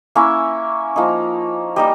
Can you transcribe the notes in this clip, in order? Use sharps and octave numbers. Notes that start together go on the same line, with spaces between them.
A#3 C#4 E4 E5
F3 A#3 D#4
G3 A#3 D#4 D#5